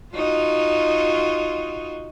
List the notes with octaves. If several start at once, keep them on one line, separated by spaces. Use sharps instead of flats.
D#4 F4 F#4